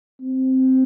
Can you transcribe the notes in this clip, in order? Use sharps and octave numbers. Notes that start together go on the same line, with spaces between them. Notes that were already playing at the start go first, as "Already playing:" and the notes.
C4